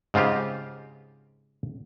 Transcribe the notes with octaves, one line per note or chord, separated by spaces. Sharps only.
G#2 C#3 C4 F4 G4